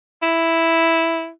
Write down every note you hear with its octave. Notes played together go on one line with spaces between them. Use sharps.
E4